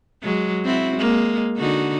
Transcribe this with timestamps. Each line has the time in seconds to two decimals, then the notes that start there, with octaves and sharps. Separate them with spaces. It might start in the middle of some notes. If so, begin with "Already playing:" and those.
0.23 F#3 G#3
0.65 C4 E4 F#4
0.97 G#3 A#3
1.57 D3 D#4 F#4